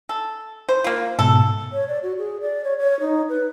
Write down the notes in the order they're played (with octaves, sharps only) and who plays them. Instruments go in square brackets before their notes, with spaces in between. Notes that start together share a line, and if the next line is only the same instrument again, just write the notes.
[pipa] A4
C5
A#3 F4
[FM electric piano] G#2 B2 A5 [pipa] A4
[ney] C#5
D5
F#4
G#4
D5
C#5
C#5
D#4
B4